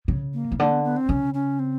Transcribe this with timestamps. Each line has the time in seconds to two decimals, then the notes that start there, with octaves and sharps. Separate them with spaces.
0.08 C#3
0.34 A#3
0.51 C#3
0.59 D3 A#3
0.72 B3
0.84 B3
0.97 C4
1.09 C#3 C#4
1.34 C#4
1.59 C4